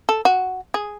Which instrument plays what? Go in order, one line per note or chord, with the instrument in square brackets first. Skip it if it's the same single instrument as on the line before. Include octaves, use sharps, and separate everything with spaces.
[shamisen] A4
F#4
G#4